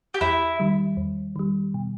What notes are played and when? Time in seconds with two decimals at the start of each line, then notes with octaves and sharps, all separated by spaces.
0.14 G4
0.21 E2 E4
0.60 D#3 G3
0.97 E2
1.36 D#3 G3
1.74 B2